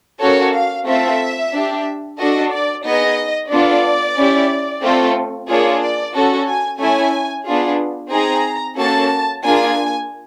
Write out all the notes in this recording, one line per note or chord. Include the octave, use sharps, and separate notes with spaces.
A#3 C#4 F#4 A4 C#5
F5
A3 C4 F4 A4 E5
D4 G4
D4 F#4 A4 D#5
D5
B3 D#4 G#4 D#5
B3 D4 F4 A4 D5
C#4 E4 G4
A3 C4 F4 A4
A#3 D4 F4 G#4 C#5
D5
C#4 F#4 A4
G#5
A3 C#4 E4 G#5
B3 D4 F4 G#4
C4 D#4 G#4 A#5
A#3 C#4 F#4 A4 A5
A#3 D4 F4 G#4 G#5